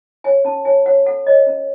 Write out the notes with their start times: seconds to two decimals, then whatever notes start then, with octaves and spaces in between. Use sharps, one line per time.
0.24 C#5 G#5
0.45 C#4 A5
0.65 C#5 G#5
0.86 C#5 F#5
1.06 A4 F#5
1.26 C#5 D#5
1.47 C#4